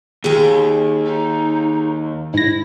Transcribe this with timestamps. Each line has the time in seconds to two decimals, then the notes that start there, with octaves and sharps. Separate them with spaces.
0.24 D#2 G#4 G5
1.06 D#4
2.34 G#2 E4 A#6